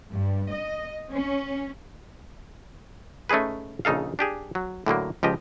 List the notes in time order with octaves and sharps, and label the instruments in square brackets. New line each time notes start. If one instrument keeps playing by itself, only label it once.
[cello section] G2
D#5
C#4
[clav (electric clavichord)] A3 C#4 D#4 G#4 B4
A#1 C#3 D#4 A4 F5
D4 G4 G#4
F#3
A2 D3 F#3 A#3
C#2 F3 G4 D#5